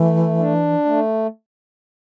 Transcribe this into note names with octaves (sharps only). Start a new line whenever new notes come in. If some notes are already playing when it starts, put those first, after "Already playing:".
Already playing: E3 A3
D4
A3